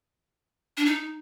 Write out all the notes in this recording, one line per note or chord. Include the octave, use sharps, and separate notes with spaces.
D4
D#4